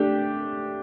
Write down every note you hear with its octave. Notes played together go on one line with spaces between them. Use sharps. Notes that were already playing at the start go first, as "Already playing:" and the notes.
Already playing: A3 D4 G4